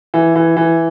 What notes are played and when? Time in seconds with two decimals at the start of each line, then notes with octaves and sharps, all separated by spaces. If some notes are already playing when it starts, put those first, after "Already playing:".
0.14 E3
0.36 E3
0.57 E3